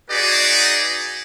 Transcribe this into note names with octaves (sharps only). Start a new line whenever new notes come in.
D#4 F#4 G#4 B4 D5